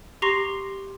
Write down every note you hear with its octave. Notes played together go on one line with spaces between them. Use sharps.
G4 A#5 C6 C#6 A#6 C7